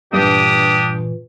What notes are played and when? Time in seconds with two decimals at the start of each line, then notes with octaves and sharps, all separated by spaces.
0.13 G2 A#2 E3 D4 G4 D#6